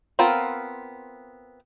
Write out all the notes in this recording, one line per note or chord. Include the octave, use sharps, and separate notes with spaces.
B3 C4 F4 A#4